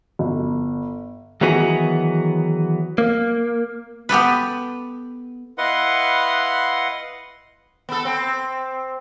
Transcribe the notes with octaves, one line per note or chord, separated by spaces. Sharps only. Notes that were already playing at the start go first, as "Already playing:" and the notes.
G1
D#3 E3 F#3 B3 F#4 G#4
A#3
B3 G4 A4 B4
E4 B4 D#5 F5 F#5 C6
B3 A4
C4